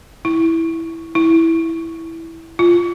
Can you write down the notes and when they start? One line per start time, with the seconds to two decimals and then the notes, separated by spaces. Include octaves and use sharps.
0.25 E4
1.15 E4
2.59 F4